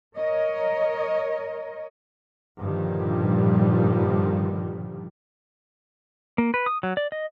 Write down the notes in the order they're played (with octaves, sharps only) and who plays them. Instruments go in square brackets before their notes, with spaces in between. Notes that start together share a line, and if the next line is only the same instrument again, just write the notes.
[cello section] A#4 C#5 D#5
[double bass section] G2 A#2 D3 D#3 F3 G3
[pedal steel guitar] A#3
B4
D#6
F#3
D5
D#5